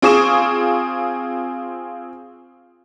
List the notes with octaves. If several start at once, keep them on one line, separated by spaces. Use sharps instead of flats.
C4 F4 G#4 C#6 D#6 E7